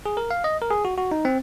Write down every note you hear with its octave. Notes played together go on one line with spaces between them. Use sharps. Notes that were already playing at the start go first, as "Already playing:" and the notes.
G#4
A#4
F5
D#5
A#4
G#4
F#4
F#4
D#4
C4